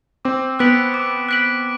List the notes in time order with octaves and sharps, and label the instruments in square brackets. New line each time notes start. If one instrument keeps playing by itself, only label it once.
[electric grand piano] C4 [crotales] D6
[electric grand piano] B3 [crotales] F#6 B6 D7 F#7
[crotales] D6
F#6 B6 D7 F#7